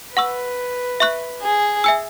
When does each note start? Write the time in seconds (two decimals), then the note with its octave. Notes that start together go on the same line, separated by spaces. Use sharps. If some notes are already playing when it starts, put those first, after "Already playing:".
0.16 B4 F#5 C#6 E6
1.00 E5 C#6 F#6
1.42 G#4
1.84 E5 G#5 E6